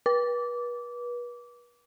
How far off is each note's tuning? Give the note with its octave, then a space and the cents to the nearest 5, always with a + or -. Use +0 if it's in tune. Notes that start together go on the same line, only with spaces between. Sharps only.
B4 -35 D6 -20